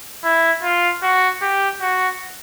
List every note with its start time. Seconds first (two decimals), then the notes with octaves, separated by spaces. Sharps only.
0.24 E4
0.63 F4
1.03 F#4
1.41 G4
1.81 F#4